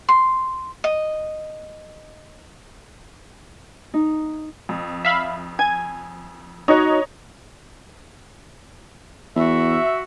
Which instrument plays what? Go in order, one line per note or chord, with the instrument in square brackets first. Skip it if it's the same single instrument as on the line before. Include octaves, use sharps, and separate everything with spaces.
[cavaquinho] C6
D#5
[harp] D#4
[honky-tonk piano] F2
[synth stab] E5 F5 B5
[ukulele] G#5 [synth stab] G#6
[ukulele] D#4 F#4 [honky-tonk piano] C#5 D#5 A#5
[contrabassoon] E2 [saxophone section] F#4 E5